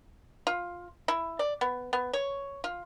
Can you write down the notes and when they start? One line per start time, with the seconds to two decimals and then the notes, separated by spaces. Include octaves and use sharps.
0.47 F4
1.08 E4
1.39 D5
1.61 B3
1.93 B3
2.13 C#5
2.64 F4